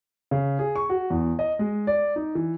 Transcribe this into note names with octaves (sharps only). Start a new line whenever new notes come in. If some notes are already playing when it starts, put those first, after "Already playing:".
C#3
G#4
C#6
F#4
E2
D#5
G#3
D5
D#4
E3